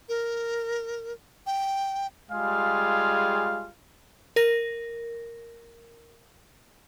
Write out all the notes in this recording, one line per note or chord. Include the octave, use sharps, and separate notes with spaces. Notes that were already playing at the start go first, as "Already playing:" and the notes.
A#4
G5
G3 G#3 F4 G#4 F5
A#4 A#6